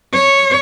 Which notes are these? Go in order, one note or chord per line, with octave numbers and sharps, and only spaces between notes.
C#5